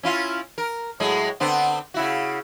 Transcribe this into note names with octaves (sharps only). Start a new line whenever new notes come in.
C#4 E4 F4
A#4
A2 F#3 G#3
D3 B3 C4
C#3 E4 F#4